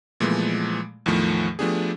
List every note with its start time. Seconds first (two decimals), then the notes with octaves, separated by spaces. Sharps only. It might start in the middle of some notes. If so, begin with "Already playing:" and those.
0.20 A#2 E3 F3 G#3 A3 B3
1.06 E2 A2 D#3 F3 A3
1.59 F3 A3 B3 D4 G4 G#4